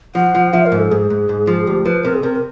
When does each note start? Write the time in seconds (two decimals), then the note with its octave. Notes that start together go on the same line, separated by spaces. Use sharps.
0.15 F3 F#5
0.35 F3
0.53 F3 E5
0.66 A#4
0.72 G#2
0.79 A4
0.91 G#2 G#4
1.10 G#2
1.29 G#2
1.47 F3
1.67 D2 G4
1.86 F3 B4
2.04 C3 A#4
2.14 G#4
2.23 C3 A#4
2.34 A#4